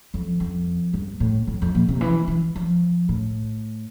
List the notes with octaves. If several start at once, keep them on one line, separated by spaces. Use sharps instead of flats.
F2
F2
G2
A2
F2
F2
A#2
C3
E3
E3
F3
A2